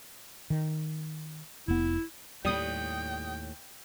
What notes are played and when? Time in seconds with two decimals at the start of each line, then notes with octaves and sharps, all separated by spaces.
0.50 D#3
1.68 F1 B3 E4
2.45 D#2 A2 G3 G5 D#6